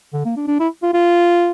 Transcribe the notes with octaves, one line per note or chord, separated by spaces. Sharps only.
D3
A#3
D4
D4
E4
F4
F4